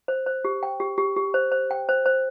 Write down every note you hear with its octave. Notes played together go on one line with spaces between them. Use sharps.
C5
C5
G4
G5
G4
G4
G4
C5
C5
G5
C5
C5